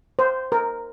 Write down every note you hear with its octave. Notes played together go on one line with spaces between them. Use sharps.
C5
A#4